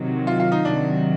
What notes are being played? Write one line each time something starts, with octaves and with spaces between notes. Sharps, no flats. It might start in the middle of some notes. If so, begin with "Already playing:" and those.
Already playing: C3 D#3 F#3
F4
F4
D#4
C3 D#3 F#3 D4